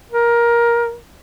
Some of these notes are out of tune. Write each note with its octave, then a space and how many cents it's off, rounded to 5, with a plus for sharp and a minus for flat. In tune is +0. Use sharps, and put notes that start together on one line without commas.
A#4 +15